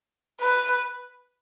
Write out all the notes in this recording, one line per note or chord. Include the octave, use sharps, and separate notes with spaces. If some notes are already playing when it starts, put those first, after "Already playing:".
B4